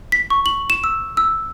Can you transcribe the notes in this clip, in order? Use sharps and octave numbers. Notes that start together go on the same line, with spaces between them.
B6
C#6
F#7
E7
E6
E6